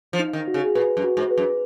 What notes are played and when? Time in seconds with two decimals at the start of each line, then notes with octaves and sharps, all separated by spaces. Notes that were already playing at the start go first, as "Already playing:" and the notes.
0.13 F3
0.19 D#4
0.33 D#3
0.48 F#4
0.54 C#3
0.75 A#2 B4
0.97 F#2
1.04 F#4
1.17 G#2
1.31 B4
1.38 F#2